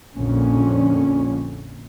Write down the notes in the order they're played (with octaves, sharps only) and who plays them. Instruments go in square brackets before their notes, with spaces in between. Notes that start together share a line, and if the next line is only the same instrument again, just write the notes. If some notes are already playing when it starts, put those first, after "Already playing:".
[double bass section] A#1 F2 A#2 D3 C#4